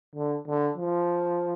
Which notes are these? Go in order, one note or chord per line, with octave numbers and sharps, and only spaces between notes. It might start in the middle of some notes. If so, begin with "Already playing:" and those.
D3
D3
F3